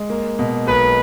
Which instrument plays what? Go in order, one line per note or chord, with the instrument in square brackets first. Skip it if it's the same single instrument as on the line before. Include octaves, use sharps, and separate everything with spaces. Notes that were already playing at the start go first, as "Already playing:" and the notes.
Already playing: [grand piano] G#3
A#3
B2
[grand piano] B1 [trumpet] B4